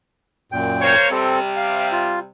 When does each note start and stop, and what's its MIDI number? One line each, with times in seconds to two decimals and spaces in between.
0.52 0.95 42
0.52 0.95 46
0.52 0.95 79
0.82 1.11 58
0.82 1.11 72
0.82 1.11 73
1.11 2.28 48
1.11 2.28 55
1.11 1.39 60
1.11 1.39 69
1.57 1.88 77
1.93 2.19 65